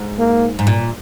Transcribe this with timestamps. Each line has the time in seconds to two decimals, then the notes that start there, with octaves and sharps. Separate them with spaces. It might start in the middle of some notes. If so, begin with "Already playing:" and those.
Already playing: G#2
0.19 A#3
0.59 G#2
0.67 A#2